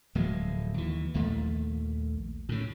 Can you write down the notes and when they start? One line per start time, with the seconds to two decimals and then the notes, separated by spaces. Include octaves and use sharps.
0.15 D1 F3 F#3 G#3
0.74 D#2 E3
1.14 A#1 D#2 A#2 A3
2.49 A2 C#3